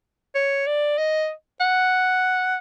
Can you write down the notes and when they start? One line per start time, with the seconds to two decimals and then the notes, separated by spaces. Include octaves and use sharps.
0.35 C#5
0.67 D5
0.98 D#5
1.60 F#5